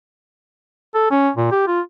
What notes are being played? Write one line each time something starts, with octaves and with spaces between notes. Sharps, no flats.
A4
C#4
A#2
G4
F4